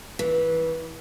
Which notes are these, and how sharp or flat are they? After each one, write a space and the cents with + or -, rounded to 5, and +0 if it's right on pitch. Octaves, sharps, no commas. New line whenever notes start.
E3 -20